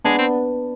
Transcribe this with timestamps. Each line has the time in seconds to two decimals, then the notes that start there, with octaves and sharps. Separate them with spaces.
0.04 G#3 B3 D4
0.18 C4